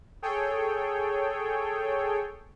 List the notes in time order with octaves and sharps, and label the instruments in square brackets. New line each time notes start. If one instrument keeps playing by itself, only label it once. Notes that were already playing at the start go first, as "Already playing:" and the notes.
[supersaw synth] G#4 A4 C#5 G5